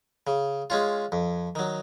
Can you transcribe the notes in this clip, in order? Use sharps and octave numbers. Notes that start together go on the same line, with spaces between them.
C#3
G#3 C#4 F4
F2
D#3 F#3